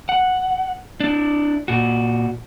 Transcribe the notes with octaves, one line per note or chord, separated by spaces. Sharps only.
F#5
D4 E4
A#2 F#4